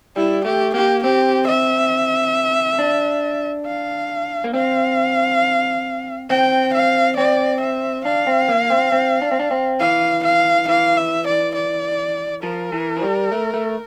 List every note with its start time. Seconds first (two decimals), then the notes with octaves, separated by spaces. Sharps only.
0.16 G3 E4
0.45 A3 G4
0.74 A#3 G4
1.03 C4 G4
1.47 E5
2.79 D4
3.66 F5
4.44 A#3
4.54 C4 F5
6.30 C4 G5
6.74 F5
7.17 C4 D5
7.61 E5
8.05 D4 F5
8.27 C4
8.48 A#3
8.70 C4
8.92 C4
9.22 D4
9.31 C4
9.40 D4
9.51 C4
9.80 E3 F5
10.24 F5
10.68 E3 F5
10.97 E5
11.27 D5
11.55 D5
12.43 F3 A#4
12.72 E3
12.97 F3
13.02 G3
13.32 A3
13.54 A3